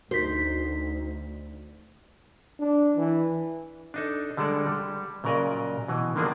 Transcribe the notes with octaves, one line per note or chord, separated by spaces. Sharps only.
D2 D#4 F#4 C5 B6
D4
E3
D4 D#4 A4
D3 G3 G#3 A4 D5
G3
A#2 C#3 F#3 A#4 D5 D#5
B2 E3
D3 D#3 F3 A#3 D4 G#4